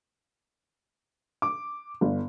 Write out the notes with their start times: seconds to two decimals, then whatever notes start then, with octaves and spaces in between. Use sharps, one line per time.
1.42 D6
2.01 G1